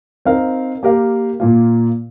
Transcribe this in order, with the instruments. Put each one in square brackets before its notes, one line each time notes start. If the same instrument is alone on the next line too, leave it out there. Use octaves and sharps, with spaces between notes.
[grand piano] C4 D#4 A#4 F5
A#3 G4 A#4 F5
A#2 A#3 F4